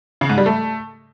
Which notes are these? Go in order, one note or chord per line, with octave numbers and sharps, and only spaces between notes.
C#3
G#2
G3
A3